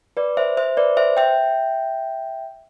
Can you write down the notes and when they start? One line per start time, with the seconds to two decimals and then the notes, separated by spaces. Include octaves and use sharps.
0.17 B4 D5
0.37 C5 E5
0.57 C5 E5
0.77 B4 D5
0.97 C5 E5
1.17 E5 G5